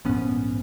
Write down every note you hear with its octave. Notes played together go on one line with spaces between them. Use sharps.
A#1 G#2 B3 C#4